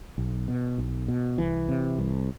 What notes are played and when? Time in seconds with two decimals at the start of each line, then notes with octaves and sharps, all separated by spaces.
0.18 B1
0.48 B2
0.78 B1
1.08 B2
1.38 C2 E3
1.68 C3
1.98 C2